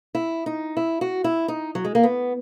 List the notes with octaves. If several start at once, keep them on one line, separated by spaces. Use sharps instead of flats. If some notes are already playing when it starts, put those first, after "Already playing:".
E4
D#4
E4
F#4
E4
D#4
F#3
G#3
A#3
B3